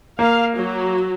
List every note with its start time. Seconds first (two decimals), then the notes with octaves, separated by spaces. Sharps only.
0.19 A#3 F5
0.55 F#3